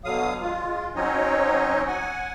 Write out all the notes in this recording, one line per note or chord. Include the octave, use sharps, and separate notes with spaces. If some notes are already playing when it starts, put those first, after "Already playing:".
B2 D3 F#3 F5 D#6
G#3 F4
F#3 C4 C#4 D#4 C#5 D#5
F#5 G#5